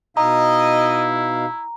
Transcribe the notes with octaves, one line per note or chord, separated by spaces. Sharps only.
B2 D#4 E4 D#5 F5 A#5